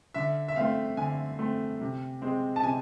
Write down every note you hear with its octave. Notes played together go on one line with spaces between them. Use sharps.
D3 E5
E5
A3 C4 F5
D3 G#5
A3 C4
C3
G#3 C4
A5
C3 G#5